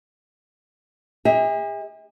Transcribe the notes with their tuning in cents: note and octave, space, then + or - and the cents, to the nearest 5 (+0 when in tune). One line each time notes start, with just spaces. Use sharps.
G#4 -45 E5 -40